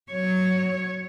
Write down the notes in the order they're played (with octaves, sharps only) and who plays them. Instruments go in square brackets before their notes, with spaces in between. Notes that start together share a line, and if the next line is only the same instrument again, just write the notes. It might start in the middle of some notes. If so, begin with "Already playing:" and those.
[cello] F#3 C#5